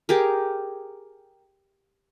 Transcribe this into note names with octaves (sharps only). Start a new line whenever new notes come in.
G4 G#4 A#4